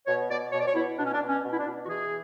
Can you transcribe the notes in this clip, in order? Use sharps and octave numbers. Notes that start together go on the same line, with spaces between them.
B2 C#5
B2 D5
B2 C#5
D5
C#5
B2 E4
B2 D4
C#4
D4
B2
C#4
B2
E4
D4
B2
F#4
E3 G#4